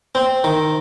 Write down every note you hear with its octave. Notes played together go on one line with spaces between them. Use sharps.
C4
D#3